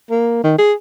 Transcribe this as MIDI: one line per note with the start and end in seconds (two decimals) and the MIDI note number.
0.11 0.41 58
0.44 0.54 51
0.58 0.73 68